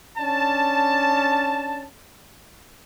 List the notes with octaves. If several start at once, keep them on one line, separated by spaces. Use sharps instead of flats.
C#4 D4 A5